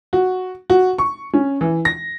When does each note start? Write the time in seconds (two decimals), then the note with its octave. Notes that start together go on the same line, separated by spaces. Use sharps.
0.13 F#4
0.70 F#4
0.98 C#6
1.34 C#4
1.61 E3
1.85 A#6